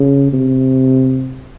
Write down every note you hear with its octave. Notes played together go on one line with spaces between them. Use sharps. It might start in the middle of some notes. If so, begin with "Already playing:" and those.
Already playing: C#3
C3